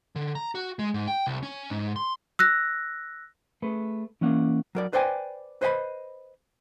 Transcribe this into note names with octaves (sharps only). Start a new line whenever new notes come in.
D3
A#5
F#4
G#3
G#2
G5
C2
C#4
G#2
C6
E6 F#6 A#6
A3 G#4 B4
E3 A#3 C#4 D5 F5 F#5
F#3 A#4 D5
B4 C5 D5 F5 G5 G#5
B4 C5 D#5 G5 B5